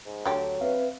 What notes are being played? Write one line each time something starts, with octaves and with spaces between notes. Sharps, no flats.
G#2
D2 D3 F#3 G4 A4 G5
C4 B4 E5 F5